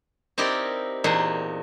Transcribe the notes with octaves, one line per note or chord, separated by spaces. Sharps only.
C4 D#4 E4 G4 A#4 D5
E2 A#2 D#4 E5 F#5 C6